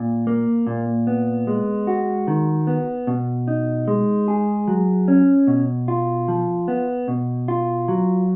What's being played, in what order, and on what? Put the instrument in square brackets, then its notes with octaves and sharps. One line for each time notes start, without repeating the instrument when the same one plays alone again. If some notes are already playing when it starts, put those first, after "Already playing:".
Already playing: [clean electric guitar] A#2
A#3
A#2
B3
G#3
F#4
D#3
B3
B2
D#4
G#3
G#4
F#3
C#4
B2
F4
F3
B3
B2
F4
F#3